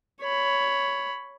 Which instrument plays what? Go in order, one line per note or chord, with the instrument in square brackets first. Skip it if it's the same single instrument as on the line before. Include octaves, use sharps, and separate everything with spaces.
[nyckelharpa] C#5 B5